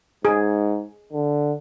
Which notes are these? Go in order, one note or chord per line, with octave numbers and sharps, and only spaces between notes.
G#2 G#4
D3